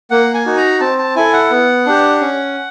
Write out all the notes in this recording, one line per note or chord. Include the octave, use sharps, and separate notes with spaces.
A#3 F#5
G#5
D#4 F#4
A#5
C4 A5
A5
E4 A4 G#5
F#5
B3
D4 G4
C#4